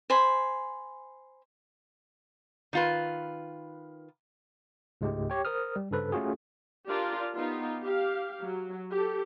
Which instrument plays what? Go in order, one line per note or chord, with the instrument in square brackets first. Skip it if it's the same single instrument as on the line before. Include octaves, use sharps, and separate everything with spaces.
[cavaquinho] C5 G#5 B5
[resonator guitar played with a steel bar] D#3 F4 B4
[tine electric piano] C#2 G#2 G#3 A3 G4
G4 C#5 G5
A#4 C5 D#6 F6
G3
G2 C#3 A4 B4 C5
A3 C#4 F4 F#4 G#4
[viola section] D4 F4 G4 A#4 D5
B3 D#4 F4 G4
G4 F5
F#3
G4 A4